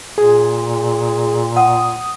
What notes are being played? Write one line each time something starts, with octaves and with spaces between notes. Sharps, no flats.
A#2 G#4
F#5 D#6